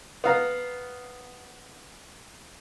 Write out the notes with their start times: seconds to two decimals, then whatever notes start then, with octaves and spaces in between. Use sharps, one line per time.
0.24 B3 F5 A#5